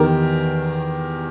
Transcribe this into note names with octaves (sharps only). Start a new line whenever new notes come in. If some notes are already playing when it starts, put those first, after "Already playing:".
Already playing: E2 D#3 G4 A#4